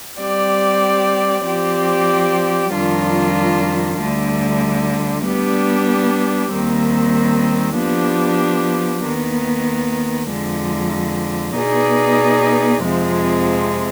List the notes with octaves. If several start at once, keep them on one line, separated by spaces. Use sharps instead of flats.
G3 C4 G4 D5
F3 C4 G4 D5
F2 D#3 G3 D4 F4
D2 D3 G3
G3 B3 D4 G4
D#2 D#3 G3 C4
F3 B3 D4 G4
D#2 D#3 B3
F2 D3 G#3
B2 B3 D#4 G#4 D5
F2 C3 F3 G#3 C4